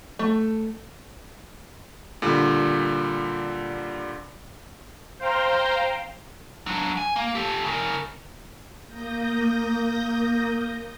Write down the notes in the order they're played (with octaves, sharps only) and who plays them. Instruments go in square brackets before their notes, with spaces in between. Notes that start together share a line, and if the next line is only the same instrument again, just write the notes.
[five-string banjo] A3
[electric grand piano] A#2 D3 G3
[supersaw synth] C5 F5 G5 A#5 C6
[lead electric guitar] F#3 D4
G#5
A#3
G4 A4
C#3 A#4
[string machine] A#3 D#6 G6 A#6